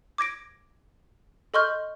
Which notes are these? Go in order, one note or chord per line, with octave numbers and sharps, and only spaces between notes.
D6 G#6 A#6 D7
A4 D#5 C6 C#6 F6 G6